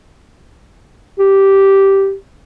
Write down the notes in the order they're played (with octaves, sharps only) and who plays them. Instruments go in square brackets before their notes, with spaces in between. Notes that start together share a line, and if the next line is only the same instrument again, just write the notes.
[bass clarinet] G4